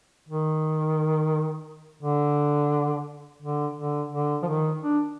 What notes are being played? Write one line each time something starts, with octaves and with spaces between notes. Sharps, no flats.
D#3
D3
D3
D3
D3
F3
D#3
D4